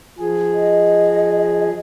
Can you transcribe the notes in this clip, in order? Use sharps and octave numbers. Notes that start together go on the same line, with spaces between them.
F3 G#4
D#5